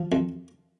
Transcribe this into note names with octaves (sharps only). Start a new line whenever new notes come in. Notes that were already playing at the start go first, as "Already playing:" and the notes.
Already playing: F3
F2